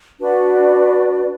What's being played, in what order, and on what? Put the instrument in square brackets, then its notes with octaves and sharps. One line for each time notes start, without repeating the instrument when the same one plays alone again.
[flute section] D4 F#4 B4 D5